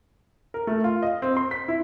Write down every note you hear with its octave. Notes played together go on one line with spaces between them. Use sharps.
A#4
A3
F4
D#5
C4
C6
B6
E4